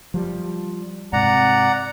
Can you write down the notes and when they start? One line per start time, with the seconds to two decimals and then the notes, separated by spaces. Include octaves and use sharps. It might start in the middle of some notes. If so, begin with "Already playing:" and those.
0.14 F3 G3
1.13 G#2 C3 D5 F#5 A#5